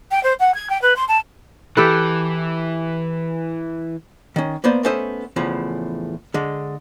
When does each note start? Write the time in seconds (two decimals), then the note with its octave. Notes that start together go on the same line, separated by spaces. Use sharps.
0.11 G5
0.23 C5
0.39 F#5
0.54 G#6
0.69 G5
0.82 B4
0.96 C6
1.08 A5
1.77 E3 G4 A4 B4
4.36 D#3 C#4
4.64 A#3 B3 C5 D5
4.83 A3 B3 C#4 A4 C5 D#5
5.36 E2 A2 C#3 F3
6.34 D3 G#3